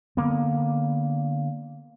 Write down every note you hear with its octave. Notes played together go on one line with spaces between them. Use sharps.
D3 A#3 B3